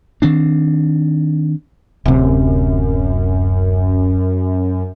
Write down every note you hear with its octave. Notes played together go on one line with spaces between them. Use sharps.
D#3 C4 D4
D1 F#2 C3